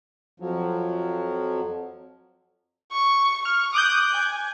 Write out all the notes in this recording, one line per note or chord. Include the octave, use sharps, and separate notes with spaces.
F2 F3 F#3
C#6
C#6 F6
D6 D#6 F#6 G6
G#5